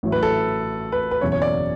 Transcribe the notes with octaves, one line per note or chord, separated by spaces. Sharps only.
A1 A2 F#3
B4
A4
B4
B4
F#1 E2 B2 F#3 C#4 C#5
C#5
D5